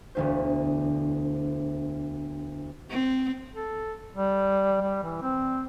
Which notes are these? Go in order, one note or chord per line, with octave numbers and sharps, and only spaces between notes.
E1 D2 C5
C4
A4
G3
G3
E3
C4